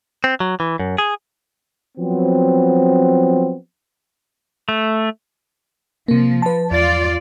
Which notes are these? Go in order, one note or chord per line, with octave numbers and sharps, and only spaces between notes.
C4
F#3
E3
F#2
G#4
F3 F#3 B3 C4
A3
C3 F3 A#3
B4 A5
E2 F4 D5 A6